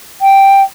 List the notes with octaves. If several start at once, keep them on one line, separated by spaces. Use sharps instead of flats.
G5